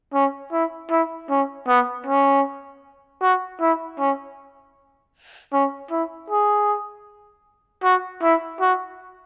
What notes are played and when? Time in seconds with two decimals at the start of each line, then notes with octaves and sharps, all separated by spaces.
0.14 C#4
0.52 E4
0.91 E4
1.30 C#4
1.68 B3
2.06 C#4
3.22 F#4
3.60 E4
3.99 C#4
5.53 C#4
5.91 E4
6.30 G#4
7.84 F#4
8.22 E4
8.61 F#4